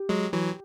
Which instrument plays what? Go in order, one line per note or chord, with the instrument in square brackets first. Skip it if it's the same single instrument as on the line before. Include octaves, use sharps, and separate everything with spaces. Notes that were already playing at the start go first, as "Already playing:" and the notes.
Already playing: [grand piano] G4
[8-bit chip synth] F#3 G#3
E3 F#3